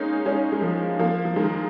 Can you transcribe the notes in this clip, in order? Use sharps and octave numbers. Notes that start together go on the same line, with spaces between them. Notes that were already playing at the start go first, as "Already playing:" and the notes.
Already playing: G#3 A#3 C#4 D#4
G#3 C#4
G#3
F3 A#3
F3 A#3
F3
D#3 G#3